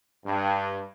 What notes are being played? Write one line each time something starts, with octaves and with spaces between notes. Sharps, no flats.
G2